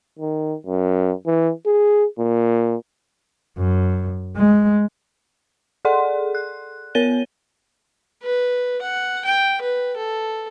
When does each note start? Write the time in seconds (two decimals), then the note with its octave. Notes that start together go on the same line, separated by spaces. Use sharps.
0.19 D#3
0.66 F#2
1.26 E3
1.66 G#4
2.19 A#2
3.58 F#2
4.37 G#3
5.85 G#4 A4 D5 F#5 C6
6.35 F#6
6.95 B3 A#4 C#5 A6 D#7 G7
8.23 B4
8.82 F#5
9.25 G5
9.62 B4
9.97 A4